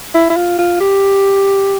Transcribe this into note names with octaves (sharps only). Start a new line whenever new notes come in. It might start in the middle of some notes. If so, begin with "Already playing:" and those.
E4
E4
F4
F4
G4